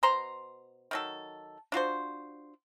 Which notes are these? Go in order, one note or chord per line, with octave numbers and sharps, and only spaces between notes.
B2 C5 A#5 C6
D#3 F#3 A4
D4 F4 F#4 C5